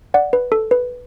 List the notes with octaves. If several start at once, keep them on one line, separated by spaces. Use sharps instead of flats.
D5 F#5
B4
A4
B4